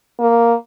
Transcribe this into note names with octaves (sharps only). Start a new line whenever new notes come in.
A#3